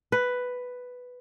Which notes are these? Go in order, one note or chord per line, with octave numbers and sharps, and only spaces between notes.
B4